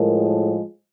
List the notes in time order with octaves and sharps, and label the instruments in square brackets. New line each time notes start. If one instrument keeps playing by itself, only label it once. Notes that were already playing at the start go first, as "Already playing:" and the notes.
Already playing: [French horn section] A2 F3 G#3 A#4